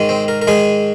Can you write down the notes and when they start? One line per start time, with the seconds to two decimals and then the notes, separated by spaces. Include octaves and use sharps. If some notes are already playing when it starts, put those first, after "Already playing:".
Already playing: G#2 D#3 G#3
0.09 C4
0.28 A#4
0.42 A#4
0.47 G#2 D#3 G#3 G#4